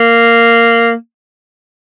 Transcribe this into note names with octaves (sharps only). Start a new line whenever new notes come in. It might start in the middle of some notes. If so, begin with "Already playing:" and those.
Already playing: A#3